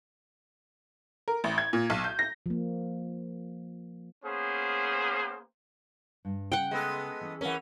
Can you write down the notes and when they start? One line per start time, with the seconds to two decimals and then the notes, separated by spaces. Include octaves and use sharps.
1.28 A#4
1.44 A1
1.58 G#6
1.73 A#2
1.90 B1
2.04 G6
2.19 A#6
2.46 F3 A#3
4.25 A#3 B3 C#4 G#4 C5
6.25 G2
6.52 C#3 F#5 G5
6.71 G#3 B3 A4
7.21 E3 C#4
7.41 E3 C#4 A#4 F#5